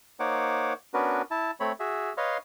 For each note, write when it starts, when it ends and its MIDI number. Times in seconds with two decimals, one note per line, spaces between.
0.20 0.73 58
0.20 0.73 63
0.20 0.73 72
0.20 0.73 73
0.20 0.73 78
0.20 0.73 86
0.94 1.22 59
0.94 1.22 61
0.94 1.22 62
0.94 1.22 66
0.94 1.22 70
0.94 1.22 71
1.31 1.51 64
1.31 1.51 81
1.60 1.72 57
1.60 1.72 60
1.60 1.72 73
1.60 1.72 83
1.80 2.13 66
1.80 2.13 68
1.80 2.13 76
2.17 2.37 71
2.17 2.37 73
2.17 2.37 75
2.17 2.37 77
2.17 2.37 84